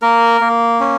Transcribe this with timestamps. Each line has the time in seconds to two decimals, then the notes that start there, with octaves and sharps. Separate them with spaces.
0.02 A#3 A#4
0.41 A#3
0.80 C#4